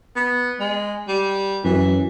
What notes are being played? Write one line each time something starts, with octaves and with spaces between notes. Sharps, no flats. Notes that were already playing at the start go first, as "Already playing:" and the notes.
B3
G#3
G3
F#2 E3